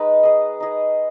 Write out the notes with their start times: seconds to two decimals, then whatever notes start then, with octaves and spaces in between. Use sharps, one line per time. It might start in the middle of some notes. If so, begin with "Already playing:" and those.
Already playing: G#3 D#4 B4
0.23 D#4 G#4 D#5
0.60 D#4 G#4 D#5